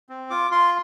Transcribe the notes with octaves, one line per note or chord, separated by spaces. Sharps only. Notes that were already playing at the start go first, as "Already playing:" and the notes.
C4
F4 D6
F4 C6